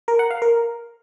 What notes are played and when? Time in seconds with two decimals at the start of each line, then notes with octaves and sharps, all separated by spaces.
0.08 A#4
0.19 F#5
0.30 F5
0.42 A#4